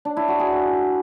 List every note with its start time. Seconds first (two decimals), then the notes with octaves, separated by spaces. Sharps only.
0.05 D4
0.17 E4
0.28 F#4
0.40 G#4